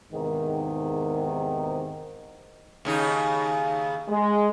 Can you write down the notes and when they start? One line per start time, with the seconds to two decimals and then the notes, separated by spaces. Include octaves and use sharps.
0.13 E2 G#2 C3 D#3
2.85 D#2 C#3 D#4
4.08 G#3